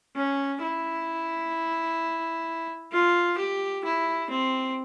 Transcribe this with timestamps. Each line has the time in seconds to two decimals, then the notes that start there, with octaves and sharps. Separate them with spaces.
0.16 C#4
0.62 E4
2.92 F4
3.38 G4
3.84 E4
4.30 C4